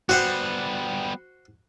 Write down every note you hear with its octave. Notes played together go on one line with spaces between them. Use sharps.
G3 B3 F#4 C5 F#5